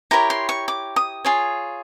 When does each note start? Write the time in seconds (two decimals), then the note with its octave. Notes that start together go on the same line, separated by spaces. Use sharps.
0.11 E4 G4 A#4 C#5 A#5
0.30 C6
0.49 C#6
0.68 D6
0.96 D#6
1.25 F4 G#4 C#5